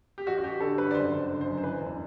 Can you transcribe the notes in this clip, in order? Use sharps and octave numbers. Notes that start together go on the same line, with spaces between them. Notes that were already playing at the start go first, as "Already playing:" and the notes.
G4
A1 F#4
F#4
A1 G4
D3 A4
G2 B4
D5
F#1 C5
F#1
D3
C5
F#2
C5
E3 B4
E1